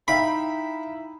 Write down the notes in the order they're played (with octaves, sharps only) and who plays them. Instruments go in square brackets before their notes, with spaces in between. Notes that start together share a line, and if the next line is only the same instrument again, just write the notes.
[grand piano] D#4 [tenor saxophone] E4 [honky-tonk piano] E5 F5 G5 [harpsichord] B5